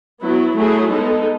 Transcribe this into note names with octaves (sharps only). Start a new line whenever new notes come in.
F#3 B3 E4
F#3 A3 E4 G#4
G#3 B3 D#4 A4